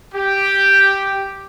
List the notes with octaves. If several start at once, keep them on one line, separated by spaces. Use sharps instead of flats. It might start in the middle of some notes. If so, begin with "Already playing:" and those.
G4